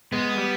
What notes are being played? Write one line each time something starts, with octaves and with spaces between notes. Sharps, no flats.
G#3 B3
G3